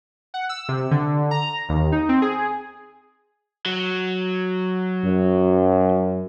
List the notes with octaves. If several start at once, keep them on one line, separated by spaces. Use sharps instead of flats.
F#5
E6
C3
D3
A#5
D#2
D#4
C4
G#4
F#3
F#2